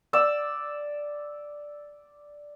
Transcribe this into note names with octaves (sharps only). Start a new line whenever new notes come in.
D5 E6